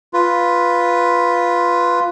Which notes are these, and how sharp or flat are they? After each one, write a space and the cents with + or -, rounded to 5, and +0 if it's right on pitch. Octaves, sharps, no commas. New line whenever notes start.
F4 +0 B4 +0